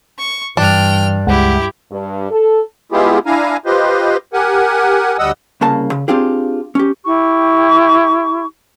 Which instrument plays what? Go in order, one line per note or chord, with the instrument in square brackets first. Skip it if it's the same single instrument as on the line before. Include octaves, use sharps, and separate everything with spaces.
[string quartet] C#6
[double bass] G2 [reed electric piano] E3 [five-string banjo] D4 [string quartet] G5 F6
[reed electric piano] C#2 G#3 F#5 [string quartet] E4 G4
[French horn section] G2
A4
[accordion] G#3 B3 E4 F4 G4 G#4
D4 E4 F5 G#5 A#5
F4 G4 B4 C5 D#5
G4 A#4 F#5 G#5
D2 G3 D#5 F#5 D#6 E6
[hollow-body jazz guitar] C2 C#3 A#3 A5
C#3
C4 D4 F4 G4 G#4
C#4 G4
[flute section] E4 G4 C#6